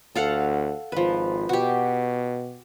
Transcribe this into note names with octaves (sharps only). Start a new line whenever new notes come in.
D2 A4 F5 F#5
G#1 F3 B4
B2 F#4 G4